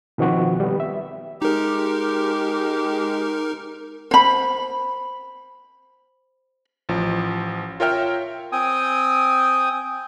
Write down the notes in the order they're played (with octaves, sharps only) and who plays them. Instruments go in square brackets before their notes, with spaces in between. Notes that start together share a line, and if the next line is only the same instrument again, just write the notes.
[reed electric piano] B2 D#3 F3 C4 F#4
G3 B3
E5
[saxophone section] G#3 G4 [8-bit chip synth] D#4 A#4
[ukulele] C5 B5
[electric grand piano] A1 F3
F4 A#4 C#5 E5 G5 F6
[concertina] C4 G5 G#5 D#6